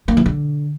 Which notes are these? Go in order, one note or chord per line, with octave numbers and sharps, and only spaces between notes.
A#3
E3
D3